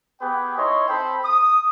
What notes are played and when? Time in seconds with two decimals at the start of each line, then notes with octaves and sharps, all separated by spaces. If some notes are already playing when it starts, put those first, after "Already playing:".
0.21 B3 G4 G#4 B4 G5
0.58 D#4 E4 C#5 D#5 C6
0.89 C4 A4 C5 G5 B5
1.25 D#6